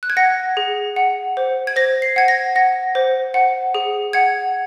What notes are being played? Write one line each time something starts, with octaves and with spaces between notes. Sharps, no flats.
F#6
G#6
F#5 A#6
G#4
F#5
C5
G#6
C5 A#6
C7
F#5 G#6
A#6
F#5 A#6
C5
F#5
G#4
F#5 G#6